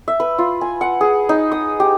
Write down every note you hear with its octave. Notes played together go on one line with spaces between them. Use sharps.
E5
B4
F4
G#5
F#5
G#4
D#4
D#6
G4